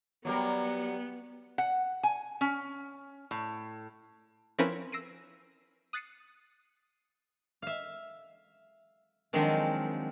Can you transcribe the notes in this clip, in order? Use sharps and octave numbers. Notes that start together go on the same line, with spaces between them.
F#3 G3 B3 A#4
F#5
G#5
C#4
A2
F3 C4 C#4 E4 A#4 B4
E6 A#6 C7 D7 D#7
D#6 F#6 A6 C7 C#7 D#7
E5 F5
D#3 F3 F#3 G#3 C4 D4